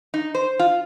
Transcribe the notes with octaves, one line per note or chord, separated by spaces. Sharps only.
D#4
C5
F4